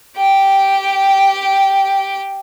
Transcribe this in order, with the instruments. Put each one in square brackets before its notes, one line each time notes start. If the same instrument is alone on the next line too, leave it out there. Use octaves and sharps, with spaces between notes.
[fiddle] G4 G5